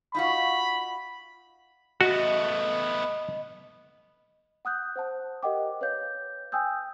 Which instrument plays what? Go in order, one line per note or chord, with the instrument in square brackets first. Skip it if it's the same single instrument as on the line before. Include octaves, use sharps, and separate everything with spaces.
[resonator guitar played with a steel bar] D#4 F4 F#4 [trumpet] B5
[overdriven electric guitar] A3 B3 [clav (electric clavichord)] F#4 [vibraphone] D#5
[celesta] F#5 D#6 F#6 G6
C5 F#5 A5
G4 A#4 D#5 F#5 G5 D6
B4 C#5 F5 G6
G5 G#5 D#6 E6 G6